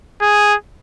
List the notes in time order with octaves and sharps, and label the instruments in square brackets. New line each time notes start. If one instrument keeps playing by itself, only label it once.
[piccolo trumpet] G#4